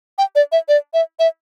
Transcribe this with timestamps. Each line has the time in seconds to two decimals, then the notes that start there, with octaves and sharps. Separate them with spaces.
0.18 G5
0.36 D5
0.52 E5
0.69 D5
0.94 E5
1.19 E5